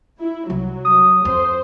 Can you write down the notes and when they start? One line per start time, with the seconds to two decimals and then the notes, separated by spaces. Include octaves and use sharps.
0.20 E4
0.50 C2 F#3
0.85 D#6
1.25 F2 C5